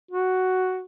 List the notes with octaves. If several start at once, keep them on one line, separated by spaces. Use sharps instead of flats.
F#4